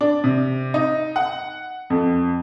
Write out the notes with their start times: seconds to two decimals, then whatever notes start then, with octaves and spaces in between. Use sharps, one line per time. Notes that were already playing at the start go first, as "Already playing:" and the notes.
0.01 D4
0.24 C3
0.74 D#4
1.16 F#5
1.90 F2